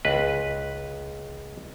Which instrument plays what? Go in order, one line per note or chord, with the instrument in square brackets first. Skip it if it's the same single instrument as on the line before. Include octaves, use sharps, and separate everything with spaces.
[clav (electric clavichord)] C#2 B4